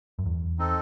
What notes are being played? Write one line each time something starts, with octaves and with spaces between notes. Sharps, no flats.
F#2
E2
C4 D#4 A4